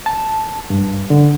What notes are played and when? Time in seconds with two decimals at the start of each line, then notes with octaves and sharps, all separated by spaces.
0.06 A5
0.70 G2
1.10 D3